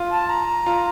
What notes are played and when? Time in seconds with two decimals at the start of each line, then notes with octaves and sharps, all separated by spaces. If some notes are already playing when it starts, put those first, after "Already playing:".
Already playing: F4
0.11 A5
0.30 A#5
0.66 F4